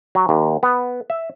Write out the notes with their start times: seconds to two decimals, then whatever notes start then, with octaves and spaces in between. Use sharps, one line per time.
0.15 F#3
0.29 D#2
0.63 B3
1.10 E5